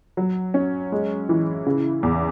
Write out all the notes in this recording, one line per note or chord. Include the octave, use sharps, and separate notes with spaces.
F#3
C#4
G#3
E3
C#3
E2